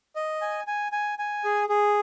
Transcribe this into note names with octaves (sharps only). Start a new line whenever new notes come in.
D#5
G#5
G#5
G#5
G#5
G#4
G#4